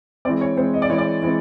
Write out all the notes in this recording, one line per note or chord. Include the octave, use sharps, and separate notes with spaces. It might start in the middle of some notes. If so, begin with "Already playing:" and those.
E3 G#3 C4 D5
C#5
E3 G#3 C4 C5
D#5
D5
E3 G#3 C4 C#5
D5
E3 G#3 C4